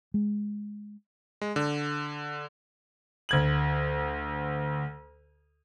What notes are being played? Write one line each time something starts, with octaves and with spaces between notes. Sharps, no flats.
G#3
G#3
D3
D2 G#6 F#7